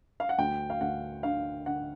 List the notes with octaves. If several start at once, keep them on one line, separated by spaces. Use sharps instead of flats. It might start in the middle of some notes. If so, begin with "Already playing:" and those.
F5
F#5
D2 G5
F5
D2 F#5
D3 F5
D3 F#5